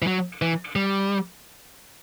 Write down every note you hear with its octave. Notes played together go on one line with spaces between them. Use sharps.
E3
F#3
E3
G3